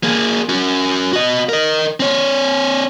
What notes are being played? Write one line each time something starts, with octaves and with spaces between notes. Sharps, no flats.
A#3 G#4
C#4 F#4
F#4 D#5
A#4 D#5
C4 C#5